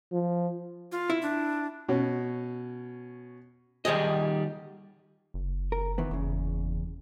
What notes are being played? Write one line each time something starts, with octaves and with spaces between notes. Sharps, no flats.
F3
F4
E4
D4
B2 C#4
D#3 G3 G#4 D#5
F#1
A#4
D#3 E3 B3
F#1 E2 C#3